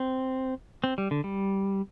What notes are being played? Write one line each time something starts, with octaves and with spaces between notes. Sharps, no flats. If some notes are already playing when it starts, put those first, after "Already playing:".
Already playing: C4
C4
G3
D3
G3